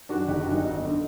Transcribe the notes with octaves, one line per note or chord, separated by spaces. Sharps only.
F#2 D#3 D4 F#4
F#1 D#4 G4
D4 F#4
F#2 D#3 D#4
G1 D#4
D3